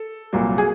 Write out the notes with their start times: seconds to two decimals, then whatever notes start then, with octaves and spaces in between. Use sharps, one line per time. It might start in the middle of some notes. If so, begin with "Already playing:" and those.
Already playing: A4
0.33 C2 A#2 F#3 A#3
0.58 G#4